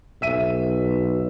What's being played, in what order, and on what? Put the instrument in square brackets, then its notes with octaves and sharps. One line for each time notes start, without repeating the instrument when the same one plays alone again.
[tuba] B1 [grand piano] E5 D#7